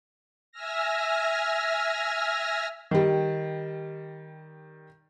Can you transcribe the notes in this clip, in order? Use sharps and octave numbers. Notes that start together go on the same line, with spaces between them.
E5 G#5 E6 F6 A#6
D#3 G3